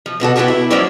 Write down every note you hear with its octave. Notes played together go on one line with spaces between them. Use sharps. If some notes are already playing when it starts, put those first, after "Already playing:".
F3
B2 D3 F#4 A4
B3 E4 F#4 G4 A#4 A5
E4
F3 F#3 A#3 C#4 D4 E4